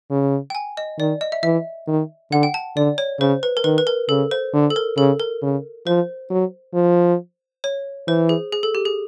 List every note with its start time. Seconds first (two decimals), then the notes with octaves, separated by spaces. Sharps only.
0.10 C#3
0.50 G5
0.55 G#5
0.77 D#5
0.98 D#3 D5
1.21 D#5
1.32 E5
1.43 E3 E5
1.88 D#3
2.31 D3 F#5
2.43 G5
2.54 A5
2.76 D3 D5
2.98 C#5
3.20 C#3 C5
3.43 B4
3.57 A#4
3.64 D#3 B4
3.78 B4
3.87 A#4
4.09 C#3 A4
4.31 C5
4.53 D3
4.70 A4
4.76 A#4
4.97 C#3 A4
5.20 A#4
5.42 C#3
5.87 F3 C5
6.30 F#3
6.74 F3
7.64 C#5
8.08 E3 C5
8.29 G#4
8.52 G#4
8.63 A4
8.75 G4
8.85 G#4